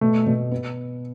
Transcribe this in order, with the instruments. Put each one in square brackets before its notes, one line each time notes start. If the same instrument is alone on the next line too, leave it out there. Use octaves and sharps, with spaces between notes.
[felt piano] B2 [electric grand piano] A3
[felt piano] B2
B3